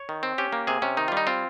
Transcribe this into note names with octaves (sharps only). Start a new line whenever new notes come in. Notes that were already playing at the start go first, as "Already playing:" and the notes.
Already playing: C#5
D#3
C4
C#4 G4
A#3
C3 G#4
C3 C#4
D#3 D#4
G3 F4
D#4
C4 F4